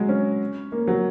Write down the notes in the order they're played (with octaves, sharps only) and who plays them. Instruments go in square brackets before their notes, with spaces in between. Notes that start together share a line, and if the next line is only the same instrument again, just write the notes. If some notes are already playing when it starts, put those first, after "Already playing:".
Already playing: [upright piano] F#3 G#3
C#4
A#3
F#3